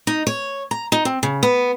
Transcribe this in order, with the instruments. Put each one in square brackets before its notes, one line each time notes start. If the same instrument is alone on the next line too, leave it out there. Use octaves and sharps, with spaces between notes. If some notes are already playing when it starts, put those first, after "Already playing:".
[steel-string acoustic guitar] D#4
C#5
A#5
D#4
C4
C#3
B3